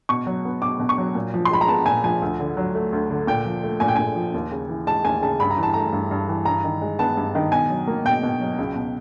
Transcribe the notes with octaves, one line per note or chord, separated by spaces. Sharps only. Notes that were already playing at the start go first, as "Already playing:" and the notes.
B2 C#6
F#3
B3
B2 D6
B2
C#6
F#3
A#2
F3
C6
G#3 B5
A#5
B3 A5
A#2 G#5
F3 G#5
D2
D3
F#3
A3
D2
D3
A#2 G5
F3
A3
A#2 G#5
G5
A#2 G#5
F3
D#2
C#3
E3
G#3 A5
D#2 G#5
C#3 A5
G2 B5
A#5
E3
A5
A3 A#5
G2
G2
E3
G2 A#5
D#3
G#3
B3 A5
G2
D#3
B2 G#5
F#3
A#3
B2 G5
B2
F#3
C#2
B2